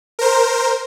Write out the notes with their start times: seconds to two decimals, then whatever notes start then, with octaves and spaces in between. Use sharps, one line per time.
0.19 A#4 C5